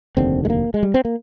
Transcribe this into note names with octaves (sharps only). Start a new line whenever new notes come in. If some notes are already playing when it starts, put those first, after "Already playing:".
F1 D#2 D3 C4
G#3
A#3
G#3
G3
C4
A#3